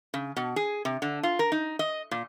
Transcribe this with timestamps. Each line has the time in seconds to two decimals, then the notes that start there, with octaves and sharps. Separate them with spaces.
0.14 C#3
0.36 B2
0.56 G#4
0.85 C3
1.02 D3
1.23 F4
1.39 A#4
1.52 D#4
1.79 D#5
2.11 A#2